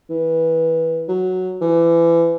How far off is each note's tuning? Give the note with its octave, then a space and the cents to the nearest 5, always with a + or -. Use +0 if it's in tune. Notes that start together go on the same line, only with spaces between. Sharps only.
E3 -15
F#3 +0
E3 +30